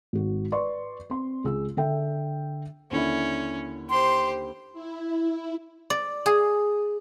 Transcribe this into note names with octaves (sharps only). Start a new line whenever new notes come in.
G#1 F#4
B4 D5 C6 C#6
C4 C6
C#2 G#4 E6
D3 A4 E5 G5
D#2 D3 C#4 E4
G4 C5 C6
E4
D5
G#4